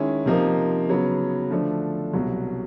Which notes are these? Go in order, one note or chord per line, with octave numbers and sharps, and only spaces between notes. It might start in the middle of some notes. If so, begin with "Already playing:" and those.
Already playing: D#3 G#3 C#4 E4 G#4
C3 F3 A#3 D#4
C#3 F#3 B3
D3 F3 A3 D4
C2 B2 F#3